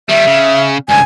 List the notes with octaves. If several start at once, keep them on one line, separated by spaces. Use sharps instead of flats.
D#3 G3 E5
C#3
C#2 G2 G#5